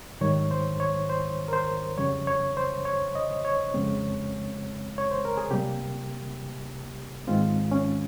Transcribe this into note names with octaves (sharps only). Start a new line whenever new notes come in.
G#2 D#3 G3 C#5
C5
C#5
C5
A#4
C5
F2 C#3 G3 C#5
C#5
C5
C#5
D#5
C#5
F2 C#3 G#3 C4
C#5
C5
A#4
G#4
C3 G3 A#3 G4
G#2 D#3 G#3 C4 F4
C#4